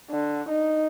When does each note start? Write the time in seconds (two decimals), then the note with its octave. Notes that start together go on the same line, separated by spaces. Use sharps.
0.10 D3
0.49 D#4